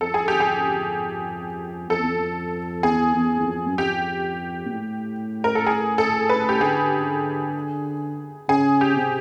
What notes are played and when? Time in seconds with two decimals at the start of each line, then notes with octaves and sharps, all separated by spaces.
0.01 F2 A4
0.14 G#4
0.28 G4
0.40 G#4
1.89 F2 A4
2.00 E2
2.10 F2
2.83 E2 G#4
3.15 E2
3.40 E2
3.46 F2
3.67 F#2
3.78 F2 G4
4.66 A#2
4.72 A2
5.44 A#4
5.55 A4
5.67 G#4
5.98 A4
6.29 B4
6.49 G4
6.61 D3 G#4
8.49 C#3 G#4
8.81 G4
8.96 C3